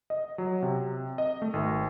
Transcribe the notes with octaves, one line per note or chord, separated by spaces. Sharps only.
D#5
F#3
C3
D#5
A3
G#1